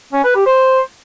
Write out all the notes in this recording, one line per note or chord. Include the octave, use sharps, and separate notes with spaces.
C#4
B4
G4
C5